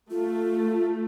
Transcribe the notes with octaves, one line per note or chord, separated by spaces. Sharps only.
A3 F4